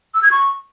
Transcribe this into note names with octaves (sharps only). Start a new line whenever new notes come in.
E6
G#6
C#6